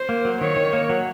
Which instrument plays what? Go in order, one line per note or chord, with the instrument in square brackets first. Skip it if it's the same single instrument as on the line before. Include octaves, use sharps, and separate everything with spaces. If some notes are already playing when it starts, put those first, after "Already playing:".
Already playing: [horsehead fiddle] C5
[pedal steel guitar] A#3
F#3
[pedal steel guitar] D#3 [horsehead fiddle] C#5
[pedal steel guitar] D#3
A#3
F#3